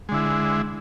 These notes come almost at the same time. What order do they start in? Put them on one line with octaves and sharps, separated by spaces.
G#3 D3 E4